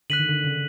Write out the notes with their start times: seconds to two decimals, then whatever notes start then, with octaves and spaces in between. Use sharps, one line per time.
0.10 D3 F#6 B6 D#7 F#7
0.19 D#3
0.29 D3
0.44 C#3